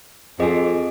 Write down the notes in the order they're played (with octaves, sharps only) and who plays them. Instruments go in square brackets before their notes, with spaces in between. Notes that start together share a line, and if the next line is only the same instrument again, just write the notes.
[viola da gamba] F2 [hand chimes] G#4 D#5 G#5